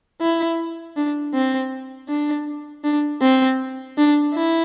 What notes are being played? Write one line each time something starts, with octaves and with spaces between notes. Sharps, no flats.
E4
D4
C4
D4
D4
C4
D4
E4